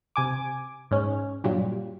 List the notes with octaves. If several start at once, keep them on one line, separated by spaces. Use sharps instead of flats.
C3 G#5 D6
G#2 C#4
G2 A#2 F#3 G3